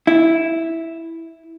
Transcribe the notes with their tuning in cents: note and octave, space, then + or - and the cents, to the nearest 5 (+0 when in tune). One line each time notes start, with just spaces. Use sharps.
E4 -5